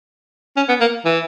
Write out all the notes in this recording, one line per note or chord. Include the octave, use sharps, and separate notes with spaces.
C#4
B3
A#3
E3